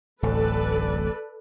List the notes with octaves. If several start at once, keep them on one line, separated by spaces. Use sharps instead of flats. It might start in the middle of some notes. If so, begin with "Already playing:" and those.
D1 A1 A4 B4 D5